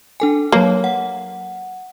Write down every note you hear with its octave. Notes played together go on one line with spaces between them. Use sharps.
D4 A4 G#5
F#3 A#3 C#5
F#5